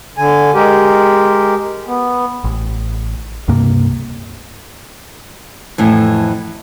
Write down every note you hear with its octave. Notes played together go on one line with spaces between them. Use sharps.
D3 G#5
G#3 G4 A#4
B3
A1
C#2 G2 C3 A#3
F2 A2 E3